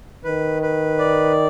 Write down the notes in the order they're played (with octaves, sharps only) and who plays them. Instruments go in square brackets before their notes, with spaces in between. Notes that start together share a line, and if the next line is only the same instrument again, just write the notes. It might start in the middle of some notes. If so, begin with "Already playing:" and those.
[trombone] D#3 [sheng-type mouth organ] B4
[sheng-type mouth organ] B4
D5